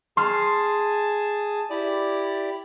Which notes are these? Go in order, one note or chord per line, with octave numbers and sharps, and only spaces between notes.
G#4 A5 C6 F6
E4 G4 D5